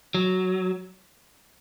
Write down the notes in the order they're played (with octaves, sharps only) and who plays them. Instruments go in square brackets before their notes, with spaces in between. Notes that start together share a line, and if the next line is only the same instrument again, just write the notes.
[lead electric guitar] F#3